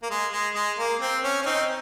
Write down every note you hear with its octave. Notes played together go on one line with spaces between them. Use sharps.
A#3
G#3
G#3
G#3
A#3
C4
C#4
C#4
C4 D#4